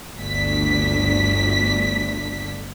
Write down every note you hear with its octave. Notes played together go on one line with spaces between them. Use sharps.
G1 D2 D4 B6